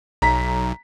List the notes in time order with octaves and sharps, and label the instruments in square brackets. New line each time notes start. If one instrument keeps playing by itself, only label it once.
[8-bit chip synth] B1 [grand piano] A#5 B6